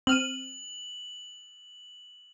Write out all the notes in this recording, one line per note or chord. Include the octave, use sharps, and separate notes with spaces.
C4 F6 D#7 F#7